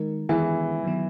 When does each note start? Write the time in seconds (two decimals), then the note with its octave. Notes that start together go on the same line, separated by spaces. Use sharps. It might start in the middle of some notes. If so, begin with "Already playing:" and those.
Already playing: D#3 G#3 D#4 A#4
0.29 D#3 E3 G#3 B3 E4 G#4
0.84 D#3 F#3 B3